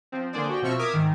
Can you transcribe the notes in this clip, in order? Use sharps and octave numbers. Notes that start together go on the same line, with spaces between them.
F3 C4
D3 A#3 D4 G#4 C5 D5
F#4 G4 G5
B2 F3 C4 E5 C#6 F6
A#4 E5 D6 D#6 F6 G#6
G#2 D#3